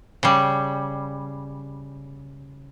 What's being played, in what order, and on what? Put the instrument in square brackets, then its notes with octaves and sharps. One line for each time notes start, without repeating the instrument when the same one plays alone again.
[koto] C#3 G3